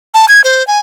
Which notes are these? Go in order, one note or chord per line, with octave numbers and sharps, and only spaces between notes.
A5
G#6
C5
G#5